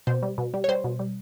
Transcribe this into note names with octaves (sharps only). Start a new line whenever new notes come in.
B2 C5
G3
B2
G3
C#5
G3 C5
B2
G3